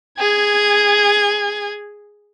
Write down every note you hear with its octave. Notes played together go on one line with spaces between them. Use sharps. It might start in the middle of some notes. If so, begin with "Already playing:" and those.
G#4 G#6